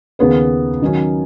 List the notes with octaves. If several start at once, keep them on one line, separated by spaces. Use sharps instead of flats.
D#2 C#3 B3 G#4 B4
D#3 F#3 C#4